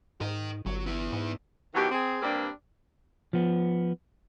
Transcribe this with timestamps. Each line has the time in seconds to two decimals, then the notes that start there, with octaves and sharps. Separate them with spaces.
0.21 G#2 A#4 D#5
0.66 G1 F#3
0.86 B3 E4
1.13 G#2
1.75 B2 D#3 E3 F#3 G4
1.92 C4 G#4
2.22 G2 G3 A#3 C4 D4 D5
3.33 F3 B3